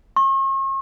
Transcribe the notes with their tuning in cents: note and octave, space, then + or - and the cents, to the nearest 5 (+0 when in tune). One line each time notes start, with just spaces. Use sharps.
C#6 -40